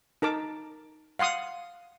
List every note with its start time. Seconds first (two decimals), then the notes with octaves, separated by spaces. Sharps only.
0.22 D#4 A#4 A5 D6
1.19 F5 F#5 C6 D#6